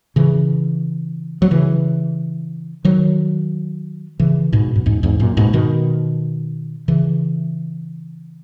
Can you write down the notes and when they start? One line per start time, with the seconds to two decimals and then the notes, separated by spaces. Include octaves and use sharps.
0.16 C#3 E3
1.42 F#3
1.51 C#3 E3
2.85 D#3 F#3
4.20 C#3 E3
4.53 G#2 B2
4.75 F#2
4.86 E2 G#2
5.03 E2 G#2
5.20 F#2 A#2
5.37 G#2 B2
5.53 B2 D#3
6.88 C#3 E3